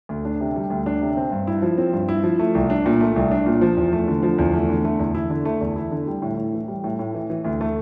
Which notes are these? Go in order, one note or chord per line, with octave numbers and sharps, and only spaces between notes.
D2
D4
C3
G3
D2
D4
C3
C4
G2
E4
F3
C4
G2
E4
F3
A3
C2
D4
A#2
A3
C2
D4
A#2
F3
E2
A3
D3
F3
E2
A3
D3
A3
E2
E4
D3
A3
E2
E4
D3
G3
A2
A2
E3
G3
A2
A2
E3
E3
D2
A3